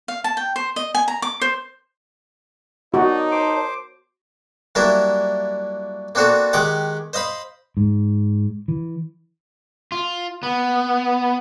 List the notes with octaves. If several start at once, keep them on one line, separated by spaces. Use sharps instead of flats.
F5
A5
G5
C5
D#5
G#5
A#5
D6
C5
D#4 F#4 A#4 C#5 D5 A5
C5 D6
F#3 G3 A#3 D4 E4 A#4
A#3 C4 D4 F#4 A4
D#3 G#3 G4 F#5 D6
C5 D#5 F5 B5 C6
G#2
E3
F4
B3